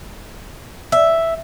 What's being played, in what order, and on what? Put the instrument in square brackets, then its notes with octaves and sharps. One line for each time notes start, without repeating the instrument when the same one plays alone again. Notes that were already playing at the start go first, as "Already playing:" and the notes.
[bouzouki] E5